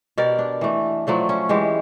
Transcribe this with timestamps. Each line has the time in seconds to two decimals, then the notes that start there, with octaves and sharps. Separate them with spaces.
0.17 B2 G4 A#4 D5
0.39 D4
0.61 E3 A3
1.07 F3 F#3 A3 D4
1.29 C#4
1.49 E3 G#3 G4